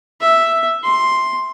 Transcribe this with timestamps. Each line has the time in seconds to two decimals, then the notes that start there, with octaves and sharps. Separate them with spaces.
0.21 E5
0.83 C6